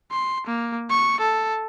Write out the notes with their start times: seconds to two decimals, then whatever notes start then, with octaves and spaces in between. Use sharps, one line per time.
0.12 C6
0.47 A#3
0.89 C#6
1.20 A4